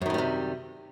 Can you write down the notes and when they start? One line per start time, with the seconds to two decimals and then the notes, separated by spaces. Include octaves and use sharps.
0.01 F#2
0.06 D#3
0.10 A2
0.14 G3
0.18 C3